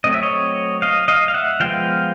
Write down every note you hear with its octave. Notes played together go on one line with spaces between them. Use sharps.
F#3 A3 C4 D#5
E5
C#5 D#5
D#5 F5
D#5 F5
F5
E5 F#5
F3 G#3 B3 F5 G5